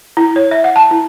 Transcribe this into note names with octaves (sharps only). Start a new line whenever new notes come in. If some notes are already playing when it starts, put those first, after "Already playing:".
E4
C#5
E5
F#5
A5
E4